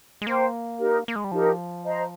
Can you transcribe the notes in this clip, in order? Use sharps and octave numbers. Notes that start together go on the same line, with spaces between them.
G#3
A#3 C5 G5 C6
D#4 G4 A#4
A#3
G#3
G3
F3 D#4 G4 A#4
C5 D#5 A#5